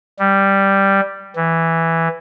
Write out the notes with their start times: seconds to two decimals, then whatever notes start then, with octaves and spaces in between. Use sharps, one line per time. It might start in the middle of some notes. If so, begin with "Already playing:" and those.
0.19 G3
1.36 E3